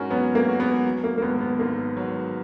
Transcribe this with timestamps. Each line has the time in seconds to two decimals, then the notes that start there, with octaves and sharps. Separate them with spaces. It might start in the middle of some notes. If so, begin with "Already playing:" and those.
Already playing: G#2 C#4 F#4 A#4
0.10 F#3 B3
0.35 A#3
0.48 F#4
0.60 B3
0.86 F#3
1.04 A#3
1.18 A#3
1.22 G#1 B3
1.41 B3
1.59 G#2 A#3
1.97 F#3